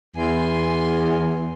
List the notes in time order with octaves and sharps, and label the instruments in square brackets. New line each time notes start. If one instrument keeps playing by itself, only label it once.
[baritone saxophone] E2 [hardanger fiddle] G#5 C6